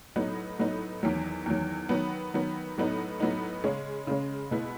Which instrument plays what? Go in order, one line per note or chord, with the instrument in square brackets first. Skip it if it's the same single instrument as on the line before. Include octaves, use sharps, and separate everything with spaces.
[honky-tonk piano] A2 F#3 B3 D#4
A2 F#3 B3 D#4
E2 D#3 F#3
E2 D#3 F#3
D#3 F#3 B3
D#3 F#3 B3
A2 F#3 B3 D#4
A2 F#3 B3 D#4
C#3 G#3 C#4
C#3 G#3 C#4
B2 G#3 B3 E4